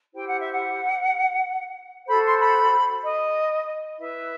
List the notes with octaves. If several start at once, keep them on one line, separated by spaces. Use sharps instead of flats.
E4 G4 C5 G5
F#5
E5
F#5
F#4 A4 C5 B5
C6
B5
D#5
E4 B4 E5